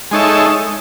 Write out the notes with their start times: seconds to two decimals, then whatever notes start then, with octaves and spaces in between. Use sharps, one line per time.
0.11 G#3 D#4 A4 C#5 E5